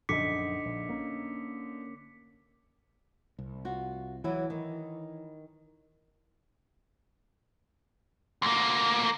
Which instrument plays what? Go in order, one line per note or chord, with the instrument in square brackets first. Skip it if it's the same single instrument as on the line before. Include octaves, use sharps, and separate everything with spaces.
[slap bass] A#1 F#2 [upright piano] D3 D#4 [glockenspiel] D6 B6 C#7
[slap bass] A#1
A#3 C#4
[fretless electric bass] C2
[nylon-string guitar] F4 F#4
[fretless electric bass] E3 [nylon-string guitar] F#3 E4
[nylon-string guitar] D#3
[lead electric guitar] D2 A#3